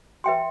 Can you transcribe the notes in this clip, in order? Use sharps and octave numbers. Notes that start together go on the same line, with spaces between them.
B4 E5 G5 C6